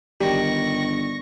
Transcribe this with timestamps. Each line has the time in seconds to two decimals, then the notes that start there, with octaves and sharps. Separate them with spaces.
0.21 G1 D#3 G3 G4 C#6 A#6